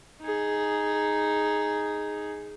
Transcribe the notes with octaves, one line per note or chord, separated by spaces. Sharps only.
D#4 G#4